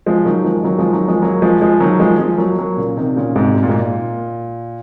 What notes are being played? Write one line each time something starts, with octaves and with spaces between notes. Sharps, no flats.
F3 G#3
D#3 F#3
F3 G#3
D#3 F#3
F3 G#3
D#3 F#3
F3 G#3
F#3 A#3
F3 G#3
F3 G#3
D#3 F#3
F3 G#3
F3 G#3
F#3 A#3
F#3 A#3
A#2 C#3
C3 D#3
A#2 C#3
G#2 C3
C3
A#2
G#2
A#2